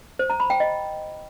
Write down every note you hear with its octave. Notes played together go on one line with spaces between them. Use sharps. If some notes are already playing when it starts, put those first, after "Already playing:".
C5
A#5
B5
G5
D#5